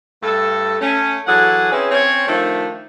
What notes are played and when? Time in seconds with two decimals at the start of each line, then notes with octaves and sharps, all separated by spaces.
0.22 G2 A3 A4
0.81 A3 C#4
1.26 E3 F#3 G#4 A4 F#5
1.71 C4 C#4 E4 G#4 B4
1.91 C4 C#4 C#5
2.28 D#3 F3 A3 D4 F4